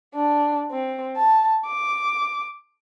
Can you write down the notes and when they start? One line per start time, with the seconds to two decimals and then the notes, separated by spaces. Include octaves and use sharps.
0.14 D4
0.71 C4
1.16 A5
1.66 D6